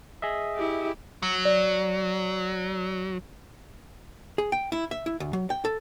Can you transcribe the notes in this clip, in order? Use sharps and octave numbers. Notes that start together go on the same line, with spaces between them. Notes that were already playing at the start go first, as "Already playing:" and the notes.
G#4 D#5 E5
E4 G4
F#3
D5
G#4
G5
E4
E5
E4
D2
F#3
G5
A4